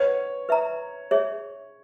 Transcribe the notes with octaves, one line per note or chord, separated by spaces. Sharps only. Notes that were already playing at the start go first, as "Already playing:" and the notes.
Already playing: B4 C#5 D#5 F#5
B4 E5 A#5
G#4 C#5 E5